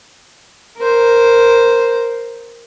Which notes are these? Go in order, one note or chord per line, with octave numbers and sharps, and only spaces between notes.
A#4 C5